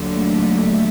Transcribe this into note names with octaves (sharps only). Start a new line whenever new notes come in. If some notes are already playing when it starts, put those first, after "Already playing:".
Already playing: D#2 D3 F#3
A3